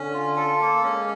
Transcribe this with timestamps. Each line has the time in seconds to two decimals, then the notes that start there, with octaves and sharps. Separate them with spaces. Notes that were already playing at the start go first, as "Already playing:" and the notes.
Already playing: D3 C#4
0.14 F4
0.37 A4
0.60 A#3
0.83 G#3 C#4